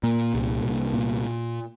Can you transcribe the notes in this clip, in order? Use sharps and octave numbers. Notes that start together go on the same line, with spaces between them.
A#2 A#3
C2
C2
A#2